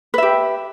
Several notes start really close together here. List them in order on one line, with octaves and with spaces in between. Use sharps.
B4 E5 G4